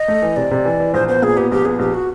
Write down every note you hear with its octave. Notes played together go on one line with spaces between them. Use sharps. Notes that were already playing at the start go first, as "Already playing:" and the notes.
Already playing: D#5
A3
E3
C3 D5
C3
E3
E3
A#1 C5
B3 C5
A#2 G#4
B3 G4
A#1 G4
B3 G#4
A#1 G4
F#4